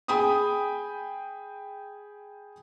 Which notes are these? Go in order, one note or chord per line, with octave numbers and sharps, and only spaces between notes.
G#4 G5 G#5 B5 D#6